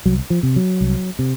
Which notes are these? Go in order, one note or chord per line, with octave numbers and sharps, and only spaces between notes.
C2 F#3
F3
C3
F#3
C2
C3